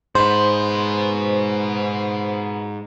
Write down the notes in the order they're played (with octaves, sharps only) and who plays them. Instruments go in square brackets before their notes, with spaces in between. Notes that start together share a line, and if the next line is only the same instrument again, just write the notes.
[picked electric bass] G#2 [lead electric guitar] F#4 B4 [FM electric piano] C5